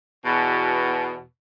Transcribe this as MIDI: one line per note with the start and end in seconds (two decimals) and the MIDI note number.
0.25 1.23 40
0.25 1.23 47